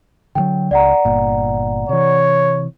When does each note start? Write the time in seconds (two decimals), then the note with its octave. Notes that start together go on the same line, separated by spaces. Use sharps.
0.35 D3 E3 F#3 G5
0.71 C#2 D5 F#5 A#5
1.05 G1 A#2
1.89 C3 E3 C#5